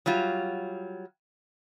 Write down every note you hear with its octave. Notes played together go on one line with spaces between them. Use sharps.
F#3 G3 F4